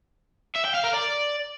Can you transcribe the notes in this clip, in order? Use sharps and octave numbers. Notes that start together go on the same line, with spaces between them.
E5
G5
F5
A#4
D5